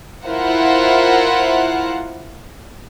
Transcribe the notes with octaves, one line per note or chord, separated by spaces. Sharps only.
E4 F4 A#4 C5 F5 F#5